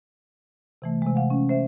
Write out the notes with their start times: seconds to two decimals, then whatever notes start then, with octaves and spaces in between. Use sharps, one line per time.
0.82 C3 E3 A3
1.02 C3 G#3
1.15 F5 F#5
1.30 C#4
1.49 C5 E5